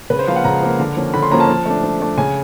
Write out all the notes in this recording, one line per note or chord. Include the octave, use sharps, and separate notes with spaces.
C#3 B4
C5
F3 A#3 F5
F#5
C#3 A#5
F3 A#3
D3
F3 A#3 C#4
D3 B5
C6
F3 A#3 C#4 A#5
A5
F3
A3 D4
F3
A3 D4
C#3 G#5